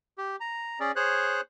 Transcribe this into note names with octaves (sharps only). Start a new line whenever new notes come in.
G4
A#5
C#4 G#4 D5
G#4 C5 C#5 F#6